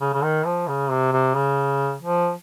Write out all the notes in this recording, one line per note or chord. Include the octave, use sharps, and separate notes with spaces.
C#3
C#3
D#3
F3
C#3
C3
C3
C#3
F3